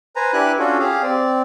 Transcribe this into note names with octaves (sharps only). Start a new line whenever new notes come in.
B4 C5 G#5 A#5
D4 E4 G4 B4 G#5 F#6
C#4 D4 F4 F#4 A4
G4 G#4 F5
C4 D5